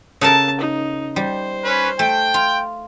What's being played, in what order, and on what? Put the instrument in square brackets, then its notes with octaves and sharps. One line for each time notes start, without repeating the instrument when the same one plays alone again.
[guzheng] C#3 A4 A#4 [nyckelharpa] A5
[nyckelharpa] D#4
[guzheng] G3 [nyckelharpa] C5
[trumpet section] C#4 B4
[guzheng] A3 [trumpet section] G5
[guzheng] F4